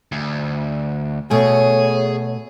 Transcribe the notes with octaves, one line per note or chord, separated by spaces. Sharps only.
D2
B2 A3 G#4 C#5